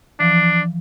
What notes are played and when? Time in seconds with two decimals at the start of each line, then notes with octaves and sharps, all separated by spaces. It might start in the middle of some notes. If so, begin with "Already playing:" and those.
0.20 E3 F3 D4